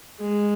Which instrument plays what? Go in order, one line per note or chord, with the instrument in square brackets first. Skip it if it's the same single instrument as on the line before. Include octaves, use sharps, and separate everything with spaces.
[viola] G#3